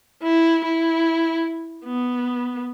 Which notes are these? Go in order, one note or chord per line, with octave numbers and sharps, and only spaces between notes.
E4
E4
B3